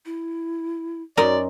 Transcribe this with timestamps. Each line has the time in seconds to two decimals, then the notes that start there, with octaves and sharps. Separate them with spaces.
0.05 E4
1.17 F#2 D#4 F#4 A#4 D5 C6